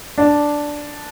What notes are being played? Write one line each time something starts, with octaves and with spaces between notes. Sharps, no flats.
D4